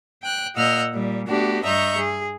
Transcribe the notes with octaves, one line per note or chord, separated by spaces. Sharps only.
G5 F#6
A#2 D#5 F#5 E6 F6 G6
A#2 G3
A3 B3 D4 F#4 G4
G2 D#5 E5 A#5 C#6 G6
G#4